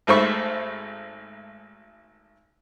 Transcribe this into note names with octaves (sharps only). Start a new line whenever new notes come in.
G#1 G#2 A3 C5 B5 C#6